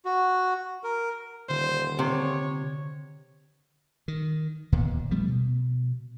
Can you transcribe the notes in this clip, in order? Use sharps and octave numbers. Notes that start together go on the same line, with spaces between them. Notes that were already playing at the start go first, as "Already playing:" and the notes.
F#4
A#4
D#1 D3 C5
C3 C#5
D#3
D1 D#2 A#2 B3
F3 G3 A3 B3
B2